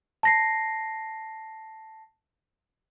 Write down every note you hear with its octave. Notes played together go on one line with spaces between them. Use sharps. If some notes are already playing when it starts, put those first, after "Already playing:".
A5 A#6 C7